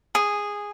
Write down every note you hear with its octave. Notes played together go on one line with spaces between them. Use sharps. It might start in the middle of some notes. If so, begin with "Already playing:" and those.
G#4